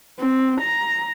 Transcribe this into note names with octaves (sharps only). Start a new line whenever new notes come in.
C4
A#5